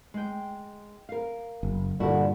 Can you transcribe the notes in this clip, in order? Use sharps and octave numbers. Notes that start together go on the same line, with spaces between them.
G#3 G5
A#4 F5
F#1
G2 A#2 D3 E4 F#4 E5